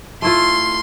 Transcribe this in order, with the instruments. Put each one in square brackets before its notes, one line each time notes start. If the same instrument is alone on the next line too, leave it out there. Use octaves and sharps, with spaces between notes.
[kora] A3 E4 F4 [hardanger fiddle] C6